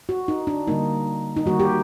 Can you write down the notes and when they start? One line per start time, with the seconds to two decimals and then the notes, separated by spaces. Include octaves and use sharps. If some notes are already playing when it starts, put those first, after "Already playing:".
0.09 F#4
0.28 D#4
0.47 D4
0.68 D3 G3 A#3 D#4
1.37 D#4
1.46 D#3 G3 A#3 F#4
1.60 G4